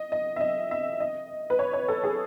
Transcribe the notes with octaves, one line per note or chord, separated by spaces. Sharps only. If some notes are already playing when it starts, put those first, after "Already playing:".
Already playing: D#5
D#5
E5
D#5
E5
D#5
B4
C#5
C#5
A4
G#4